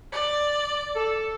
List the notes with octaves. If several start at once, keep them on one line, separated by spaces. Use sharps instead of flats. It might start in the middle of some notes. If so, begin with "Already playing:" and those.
D5
A4